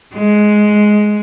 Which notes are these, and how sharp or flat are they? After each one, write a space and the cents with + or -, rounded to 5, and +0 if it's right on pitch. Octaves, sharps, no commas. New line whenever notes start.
G#3 +10